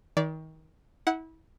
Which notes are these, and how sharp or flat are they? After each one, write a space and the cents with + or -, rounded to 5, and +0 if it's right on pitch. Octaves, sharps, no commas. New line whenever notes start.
D#3 +30 D5 -25
E4 -30 F#5 +0